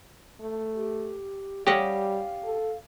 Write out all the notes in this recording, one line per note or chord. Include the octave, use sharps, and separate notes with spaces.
A3
G4
G3 C#4 G4 D#5 F5 F#5
A4